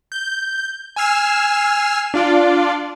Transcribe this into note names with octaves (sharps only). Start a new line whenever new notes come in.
G6
G#5 E6 F6 C7 E7
D4 F4 D5